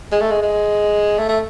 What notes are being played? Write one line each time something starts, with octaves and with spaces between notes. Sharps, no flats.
G#3
A3
G#3
G#3
A3
A3